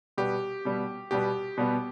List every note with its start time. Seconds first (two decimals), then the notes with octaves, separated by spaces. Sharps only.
0.18 B2 G3 B3 G4
0.65 B2 G3 B3
1.11 B2 G3 B3 G4
1.58 B2 G3 B3